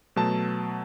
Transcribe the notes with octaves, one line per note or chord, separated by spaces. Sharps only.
B2 F#3 A3 A5